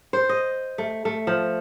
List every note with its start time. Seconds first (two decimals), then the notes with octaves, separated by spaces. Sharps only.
0.13 C5
0.29 D#5
0.78 A3
1.05 A3
1.27 F3